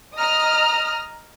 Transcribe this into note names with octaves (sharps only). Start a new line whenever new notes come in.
D#5 A#5 D#6 F6